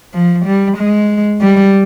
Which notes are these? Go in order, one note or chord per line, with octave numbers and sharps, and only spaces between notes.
F3
G3
G#3
G3